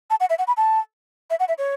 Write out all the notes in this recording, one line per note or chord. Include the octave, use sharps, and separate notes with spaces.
A5
F#5
E5
F#5
B5
A5
E5
F#5
E5
C#5